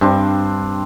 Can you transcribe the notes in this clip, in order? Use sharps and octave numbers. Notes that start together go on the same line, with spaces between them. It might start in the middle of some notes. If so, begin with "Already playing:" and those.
G2 C4 D4 C5